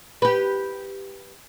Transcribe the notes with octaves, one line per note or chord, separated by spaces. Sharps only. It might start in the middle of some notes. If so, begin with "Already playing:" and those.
G4 B4